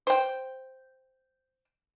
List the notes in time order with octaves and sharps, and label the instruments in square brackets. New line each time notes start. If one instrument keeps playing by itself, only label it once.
[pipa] C5 G5